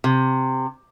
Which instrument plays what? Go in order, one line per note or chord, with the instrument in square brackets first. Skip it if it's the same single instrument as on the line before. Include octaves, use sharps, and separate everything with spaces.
[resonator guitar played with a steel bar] C3